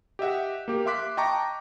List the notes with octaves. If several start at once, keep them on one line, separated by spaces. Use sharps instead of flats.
G4 D#5 E5 F#5
A#3 G4
E5 F5 C6 D6 F#6 B6
D#5 G5 A5 A#5 C#6 D6